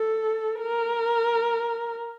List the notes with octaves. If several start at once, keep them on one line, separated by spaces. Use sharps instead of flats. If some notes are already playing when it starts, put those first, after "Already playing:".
Already playing: A4
A#4